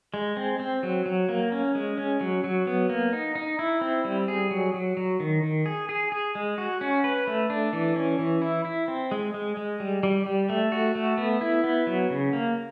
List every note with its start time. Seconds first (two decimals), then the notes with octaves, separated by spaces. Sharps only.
0.14 G#3
0.37 C4
0.60 C4
0.83 F#3
1.06 F#3
1.29 A#3
1.52 C#4
1.75 G#3
1.98 C#4
2.21 F#3
2.44 F#3
2.67 B3
2.89 A#3
3.13 D#4
3.35 D#4
3.59 E4
3.81 C4
4.05 G3
4.28 G#4
4.51 F#3
4.74 F#3
4.97 F#3
5.20 D#3
5.43 D#3
5.66 G#4
5.89 G#4
6.12 G#4
6.35 G#3
6.58 F#4
6.81 C#4
7.04 B4
7.27 A3
7.50 D4
7.73 E3
7.96 C#4
8.19 E3
8.42 E4
8.65 E4
8.88 C4
9.11 G#3
9.34 G#3
9.57 G#3
9.80 G3
10.03 G3
10.26 G3
10.49 A3
10.72 F#4
10.95 A3
11.18 B3
11.41 E4
11.64 B3
11.87 F#3
12.10 C#3
12.33 A#3